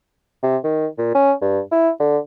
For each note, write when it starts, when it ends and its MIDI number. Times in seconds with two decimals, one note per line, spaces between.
0.43 0.57 48
0.64 0.86 51
0.98 1.11 46
1.14 1.32 61
1.41 1.60 43
1.72 1.90 64
1.99 2.18 50